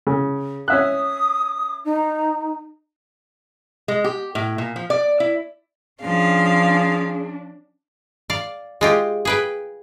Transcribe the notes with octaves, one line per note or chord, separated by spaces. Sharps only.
C#3
C#4 E5 D#6 F#6
D#4
G#3
G4
A2
A#2
F3
D5
E4
F3 C#4 D4 G#4 F5
D5 F5
G#3 F4 G4
G#4 B4 G5